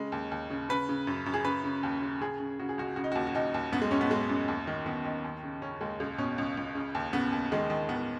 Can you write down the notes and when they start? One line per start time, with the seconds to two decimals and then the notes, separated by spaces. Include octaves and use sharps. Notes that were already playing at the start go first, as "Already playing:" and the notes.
Already playing: C#3 G#3
0.12 D#2
0.31 D#2
0.50 C#3
0.69 C#3 B4
0.89 C#3
1.07 F#2
1.26 F#2
1.34 G#4
1.45 C#3 B4
1.64 C#3
1.83 D#2
2.02 C#3
2.21 C#3 G#4
2.40 C#3
2.59 C#3 F#4
2.69 G#4
2.78 C#2 F#4
2.96 C#3 F#4
3.04 D#4
3.12 F#4
3.15 D#2
3.27 F#4
3.35 D#2 D#4
3.54 D#2
3.72 F#2 B3
3.82 G#3
3.91 F#2 C#4
4.01 B3
4.10 F#2 G#3
4.29 F#2
4.48 D#2
4.67 D#3
4.86 D#3 B3
5.05 D#3
5.24 D#2
5.43 C#3
5.62 C#3 C#4
5.81 D#2 G#3
6.00 C#2 G#3
6.18 B2 C#4
6.38 C#2
6.57 C#2
6.75 C#3
6.95 D#2
7.13 C#3 B3
7.32 D#2
7.52 D#3 G#3
7.70 D#3
7.89 D#3 B3